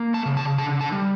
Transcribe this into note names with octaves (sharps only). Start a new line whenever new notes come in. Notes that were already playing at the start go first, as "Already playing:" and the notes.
Already playing: A#3
A5
C#3
A5
D3 A5
A5
G3